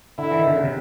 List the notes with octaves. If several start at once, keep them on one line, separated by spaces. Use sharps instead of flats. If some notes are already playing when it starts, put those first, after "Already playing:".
D3 E4
E3
D#3
D3
C#3
C3